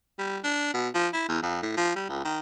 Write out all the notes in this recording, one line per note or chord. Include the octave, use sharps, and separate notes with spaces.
G3
D4
B2
F3
E4
E2
F2
A2
F3
G3
C#2
D#3